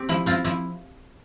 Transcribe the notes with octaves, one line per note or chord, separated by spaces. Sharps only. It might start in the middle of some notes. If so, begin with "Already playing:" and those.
Already playing: C4 G4
F3 E4
C4 E4 F4
F3 E4